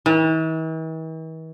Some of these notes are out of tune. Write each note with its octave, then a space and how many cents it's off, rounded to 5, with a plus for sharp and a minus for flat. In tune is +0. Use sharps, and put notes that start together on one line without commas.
E3 -45